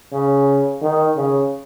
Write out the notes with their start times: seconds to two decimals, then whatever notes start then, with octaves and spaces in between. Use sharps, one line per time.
0.13 C#3
0.82 D#3
1.17 C#3